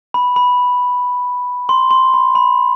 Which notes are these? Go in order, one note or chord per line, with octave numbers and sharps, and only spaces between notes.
B5
B5
C6
C6
B5
B5